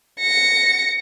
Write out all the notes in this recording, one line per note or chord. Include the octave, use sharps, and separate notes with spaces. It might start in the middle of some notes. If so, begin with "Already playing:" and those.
A#6 C#7